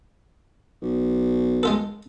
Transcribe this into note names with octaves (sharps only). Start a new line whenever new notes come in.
B1
G#3 F4 A4